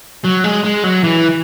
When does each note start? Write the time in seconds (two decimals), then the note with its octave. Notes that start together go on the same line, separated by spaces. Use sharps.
0.24 F#3
0.44 G#3
0.64 G#3
0.84 F#3
1.04 E3